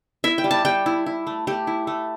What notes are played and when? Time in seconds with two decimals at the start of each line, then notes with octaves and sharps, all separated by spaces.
0.24 E4 E5
0.38 G5
0.44 G3
0.51 A5
0.65 G3 G5
0.86 E4
1.06 E4
1.27 A3
1.47 A3 G4
1.67 E4
1.87 A3